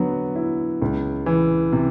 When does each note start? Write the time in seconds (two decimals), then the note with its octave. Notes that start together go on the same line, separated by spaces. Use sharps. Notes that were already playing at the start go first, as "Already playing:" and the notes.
Already playing: D3 F#3 B3
0.36 E4
0.82 C#2
1.26 E3
1.72 C3